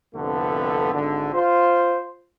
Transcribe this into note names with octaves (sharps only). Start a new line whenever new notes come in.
C2 F2 D3 A3 B3
G#1 D3
F4 C5